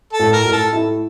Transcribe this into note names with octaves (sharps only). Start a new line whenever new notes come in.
A4
A2
A#4
A2
A4
E4